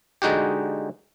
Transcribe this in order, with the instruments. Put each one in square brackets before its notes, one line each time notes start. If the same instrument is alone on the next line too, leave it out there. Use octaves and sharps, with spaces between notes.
[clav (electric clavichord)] D3 G#3 D#4 F#4 G4